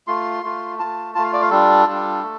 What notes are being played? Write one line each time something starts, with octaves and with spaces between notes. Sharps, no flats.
A3 F4 C6
A3 F4
A3 F4 A5
A3 F4 A5
F5
D5
F5
G3 D4 F4 A4
G3 D4 F4
A3